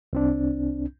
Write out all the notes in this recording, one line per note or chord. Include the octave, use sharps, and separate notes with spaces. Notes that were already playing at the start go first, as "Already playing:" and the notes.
C2 C4 D4